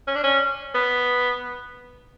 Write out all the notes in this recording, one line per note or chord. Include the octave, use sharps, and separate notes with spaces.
C#4
D4
C#4
B3